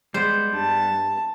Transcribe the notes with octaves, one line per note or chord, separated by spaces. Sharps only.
G3 G#3 B3 C5
G2 A5